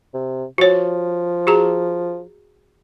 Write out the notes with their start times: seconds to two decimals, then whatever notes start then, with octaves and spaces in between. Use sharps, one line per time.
0.14 C3
0.58 F3 F#4 C#5
1.47 F#4 G#4 A#5